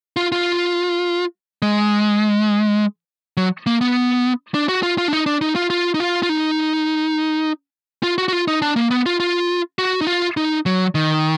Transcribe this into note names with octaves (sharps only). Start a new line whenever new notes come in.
F4
F4
G#3
F#3
A#3
B3
D4
F#4
F4
F4
D4
D#4
D4
D#4
F4
F4
D#4
F4
F4
D#4
F4
F#4
F#4
F4
D#4
D4
A#3
B3
F4
F4
F#4
D#4
F4
D#4
F#3
D#3